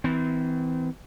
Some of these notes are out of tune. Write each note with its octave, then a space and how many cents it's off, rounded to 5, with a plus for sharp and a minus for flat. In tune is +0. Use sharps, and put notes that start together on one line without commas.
E3 -30 C4 -35